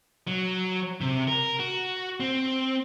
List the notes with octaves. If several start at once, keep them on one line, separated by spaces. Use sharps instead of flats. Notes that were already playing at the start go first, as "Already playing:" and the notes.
F#3
C3
A#4
F#4
C4